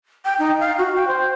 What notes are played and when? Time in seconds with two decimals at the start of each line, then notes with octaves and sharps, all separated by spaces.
0.25 G5
0.39 D#4
0.60 F5
0.78 F#4
0.95 G5
1.07 C5